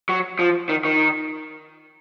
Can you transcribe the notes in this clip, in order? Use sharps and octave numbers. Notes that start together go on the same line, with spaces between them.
F#3
F3
D#3
D#3